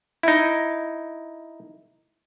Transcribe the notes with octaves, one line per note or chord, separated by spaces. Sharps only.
D#4 E4